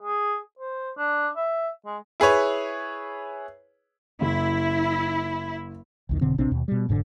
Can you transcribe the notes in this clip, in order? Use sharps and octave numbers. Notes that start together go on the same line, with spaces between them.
G#4
C5
D4
E5
G#3
E4 G#4 B4 C#5
F#1 E4
B1 E2 D#3
F1 B2 D3 C4
A#1 C3 C4 D4
D#2 B2
B2 G3
F1 G#2 B2 D3